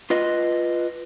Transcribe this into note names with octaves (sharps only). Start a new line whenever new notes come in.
F4 B4 D#5